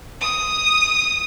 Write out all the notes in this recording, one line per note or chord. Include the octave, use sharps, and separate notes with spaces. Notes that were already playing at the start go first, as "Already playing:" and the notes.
D#6